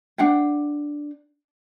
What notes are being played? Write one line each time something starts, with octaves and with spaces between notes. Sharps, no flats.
D4 F#5 G5